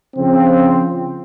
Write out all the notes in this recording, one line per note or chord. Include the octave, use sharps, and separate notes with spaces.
C#3 F3 C4